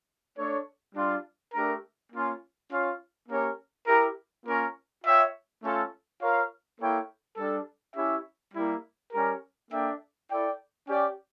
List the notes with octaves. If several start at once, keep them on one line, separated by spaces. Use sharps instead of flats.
A3 D4 A4 C#5
G3 D4 F4
A3 D4 G4 A#4
A#3 C#4 F4
C#4 F4 C#5 F5
A#3 C#4 G4 A#4 C#5
E4 G4 A#4
A#3 C#4 F4 A#4 C#5
F4 C#5 E5 G5
A3 C#4 F4 A4
F4 A#4 C#5 F5
A#3 E4 A4 C#5 G5
G3 D4 A4
C#4 E4 G4 C#5 E5
G3 A#3 E4
G3 C#4 G4 A#4
A#3 D4 A4 E5 G5
E4 A4 D5 G5
C#4 G4 D5 G5